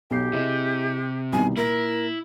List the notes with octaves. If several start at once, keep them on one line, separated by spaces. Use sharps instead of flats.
B1 F#3 G4 C7
C3 E4 G#4 D#5
C2 B2 D#3 G#5
A#2 E4 A#4